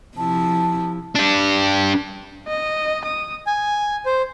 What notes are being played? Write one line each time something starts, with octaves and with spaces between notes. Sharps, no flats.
C3 F3 E4 A5
D4 G4
D#5
D#6
G#5
C5